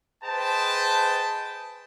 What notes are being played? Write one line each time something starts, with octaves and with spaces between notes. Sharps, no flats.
G#4 B4 C5 D#5 G5 A5